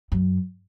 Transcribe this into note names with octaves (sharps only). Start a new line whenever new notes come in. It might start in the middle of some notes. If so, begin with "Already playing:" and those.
F#2